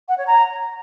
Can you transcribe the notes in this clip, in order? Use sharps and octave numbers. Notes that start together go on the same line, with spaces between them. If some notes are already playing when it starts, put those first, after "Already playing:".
F#5
C#5
A#5